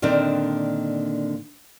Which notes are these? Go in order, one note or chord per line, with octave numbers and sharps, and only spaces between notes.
A#2 D3 D#3 C4 D4 D#4